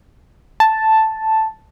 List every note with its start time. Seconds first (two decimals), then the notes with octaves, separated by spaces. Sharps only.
0.60 A5